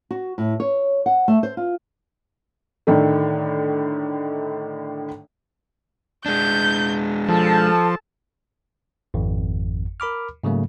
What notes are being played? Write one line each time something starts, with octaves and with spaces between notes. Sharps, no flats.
F#4
A2
C#5
F#5
A3
C5
F4
A2 D3 D#3 A3
G#3 D4 G6
F3 A4 A5
G#1 F2
A#4 B5 D6 F6
G#2 C#3 F#3 A3 A#3